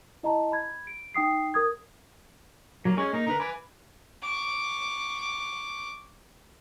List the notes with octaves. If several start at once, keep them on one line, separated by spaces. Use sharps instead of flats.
E4 D#5 A5 A#5
B5 G#6
D7
D#4 G5 D#6 C7
A#4 D#6 G#6
F#3 A#3
G#3 C#4 G#4 C#6
A#3 D#4 A#4
D3 A#4 B4
B4 G#5 D6
C#6 D6